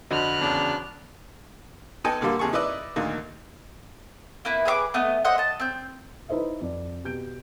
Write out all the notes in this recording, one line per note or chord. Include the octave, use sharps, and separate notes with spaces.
F2 D3 F#4 C5 D#5 B5 F6 F#6
E2 C#3 D4
B3 D#4 A4 D#5 G5 G#5
A#2 D3 G3 A#3
D#2 C3 G#4 A4 C#6
D#4 E4 B4 D5 D#5
D2 A#2 D#3 A#3
A#3 B3 E4 B4
G#4 B4 E5 D6
A3 B3 D#5
C5 D#5 E5 F#5
D#5 A5
C4 G6
D#4 E4 B4 C5 D#5 E5
F2 D5
B2 G4 G6 D7